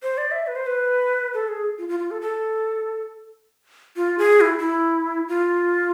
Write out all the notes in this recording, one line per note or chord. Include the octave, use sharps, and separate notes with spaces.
C5
D5
E5
B4
C5
B4
A4
G#4
F4
F4
F4
A4
A4
F4
G#4
E4
E4
F4